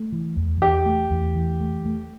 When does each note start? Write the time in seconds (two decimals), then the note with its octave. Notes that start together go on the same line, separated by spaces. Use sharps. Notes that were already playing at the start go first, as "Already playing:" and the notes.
Already playing: A3
0.12 E3
0.36 E2
0.61 E2 G4
0.86 A3
1.11 E2
1.36 E3
1.60 A3
1.86 A3